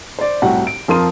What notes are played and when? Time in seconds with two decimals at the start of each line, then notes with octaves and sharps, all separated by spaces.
0.19 C5 D5
0.42 C2 A2 F#4 F#5 G5
0.67 D7
0.88 F2 F3 A#4 C6 D#6 D#7